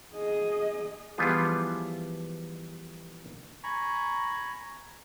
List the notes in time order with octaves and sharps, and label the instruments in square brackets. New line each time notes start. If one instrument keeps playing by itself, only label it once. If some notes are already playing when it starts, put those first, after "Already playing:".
[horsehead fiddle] G#4 D#5
[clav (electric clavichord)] E3 F3 G3 B3 F4 G#4
[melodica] G#5 A#5 B5 C#6